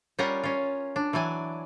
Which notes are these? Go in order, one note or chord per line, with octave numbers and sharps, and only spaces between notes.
G3 C#4 F4 A#4 D5 F#5
C#4 F4
D4
E3 F#3 D5 G#5